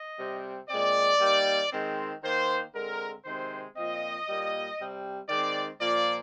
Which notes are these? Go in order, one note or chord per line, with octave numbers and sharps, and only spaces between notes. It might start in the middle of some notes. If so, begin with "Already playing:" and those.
Already playing: D#5
C3 G3 C4
A#2 G#3 C4 D5
D#3 G3 A#3
D#3 G#3 C4
D#3 A#3 C5
D3 G#3 C4 A#4
C3 D#3 G#3 C4 C5
A#2 F3 C4 D#5
A#2 G3 A#3
C3 G3 C4
D#3 G#3 C4 D5
A#2 F3 A#3 D5